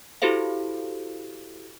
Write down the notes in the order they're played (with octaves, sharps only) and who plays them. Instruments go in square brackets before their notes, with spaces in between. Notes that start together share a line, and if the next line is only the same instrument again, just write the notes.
[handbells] E4 F#4 G4 A4 C5 F5